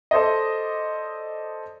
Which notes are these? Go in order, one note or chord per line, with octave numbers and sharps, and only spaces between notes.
A4 C5 D5 D#5